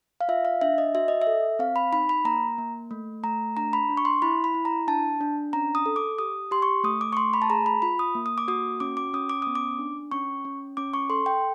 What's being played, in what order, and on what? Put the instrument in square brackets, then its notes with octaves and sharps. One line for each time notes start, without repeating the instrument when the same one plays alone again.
[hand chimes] F5
F4 E5
F5
D4 E5
D#5
F#4 E5
D#5
E5
A4
C4 F5
B5
D#4 B5
B5
A#3 A#5
A#3
A3
A3 A#5
D4 A#5
B5
D4
C#6
C6
E4 B5
B5
E4
A#5
D4 A5
D4
C#4 A#5
D#6
A4
D6
G4 D#6
G4 C6
C#6
A3 D#6
D6
C#6
A3 C6
B5
A5
G#4 A#5
B5
F4 B5
D#6
A#3
D#6
D6
F#4 D#6
C#4 D6
D6
C#4 D#6
D6
B3 D#6
D6
D4
C#4 C#6
C#4
C#4 D6
C#6
A4 C6
G5